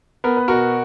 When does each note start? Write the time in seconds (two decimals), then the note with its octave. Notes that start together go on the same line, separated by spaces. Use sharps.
0.24 B3 A#4
0.37 B4
0.48 B2 F#4 A#4